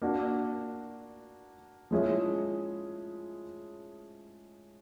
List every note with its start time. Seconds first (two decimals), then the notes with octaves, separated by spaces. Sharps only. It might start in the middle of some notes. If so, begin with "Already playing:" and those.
0.02 A#3 D4 F#4
1.91 F3 G#3 C#4 E4 G#4